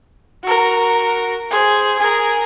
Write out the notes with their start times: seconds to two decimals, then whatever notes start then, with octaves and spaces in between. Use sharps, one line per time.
0.44 F#4 A#4
1.51 G#4 C5
1.99 G#4 A#4